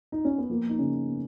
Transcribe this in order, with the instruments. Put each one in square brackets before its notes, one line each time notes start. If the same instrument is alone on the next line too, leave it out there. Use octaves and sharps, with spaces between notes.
[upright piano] D#4
C#4
B3
F3 A#3
D#4
C#3 C#4
B3